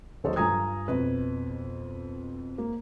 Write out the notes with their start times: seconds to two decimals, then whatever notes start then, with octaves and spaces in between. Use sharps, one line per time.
0.24 D#2 F#3 A4 C5 C#5 D#5
0.36 G2 F4 G#5 A#5 D#6 G#6
0.88 F2 B2 B4
2.58 A#3